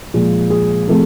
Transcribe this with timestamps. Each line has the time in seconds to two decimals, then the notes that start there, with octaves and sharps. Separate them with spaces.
0.14 A#2 F3 G#3
0.50 G#4
0.87 C3 F3 A3